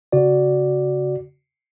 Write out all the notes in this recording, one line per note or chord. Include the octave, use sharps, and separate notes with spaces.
C#3 F#4 D5